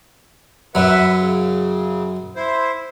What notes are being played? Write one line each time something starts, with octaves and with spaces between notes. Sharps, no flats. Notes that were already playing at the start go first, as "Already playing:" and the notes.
F#2 F#3 B4 E5 F#5
C#3
E4 C5